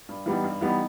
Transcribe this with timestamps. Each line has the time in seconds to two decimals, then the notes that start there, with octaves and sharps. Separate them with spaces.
0.09 G2
0.26 E3 G3 B3 D#4
0.44 G2
0.61 E3 G3 B3 D#4